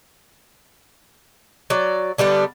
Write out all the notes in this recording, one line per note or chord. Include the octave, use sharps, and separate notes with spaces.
F#3 D5
D3 G3 B3 D4